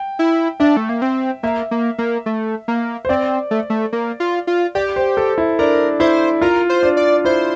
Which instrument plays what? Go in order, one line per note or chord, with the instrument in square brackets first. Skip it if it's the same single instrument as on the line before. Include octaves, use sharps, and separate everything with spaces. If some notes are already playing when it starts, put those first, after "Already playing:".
Already playing: [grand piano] G5
[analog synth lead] E4
[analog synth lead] D4 [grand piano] E5
[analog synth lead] A3
A#3
C4
[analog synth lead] A#3 [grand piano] E5
[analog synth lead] A#3
A#3
A3
A#3
[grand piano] C5
[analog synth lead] C4 [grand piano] D5
[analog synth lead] A3
A3
A#3
F4
F4
[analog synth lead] G4 [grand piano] D5
[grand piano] C5
A4
E4
[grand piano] D4 [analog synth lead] A#4
[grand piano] E4 [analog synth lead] C5
[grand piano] F4 [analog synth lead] A#4
[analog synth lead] C5
[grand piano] D4
[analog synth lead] D5
[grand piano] E4 [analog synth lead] C5